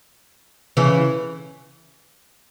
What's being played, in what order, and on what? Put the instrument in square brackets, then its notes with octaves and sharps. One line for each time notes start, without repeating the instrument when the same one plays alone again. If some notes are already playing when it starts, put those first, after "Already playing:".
[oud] C#3 E3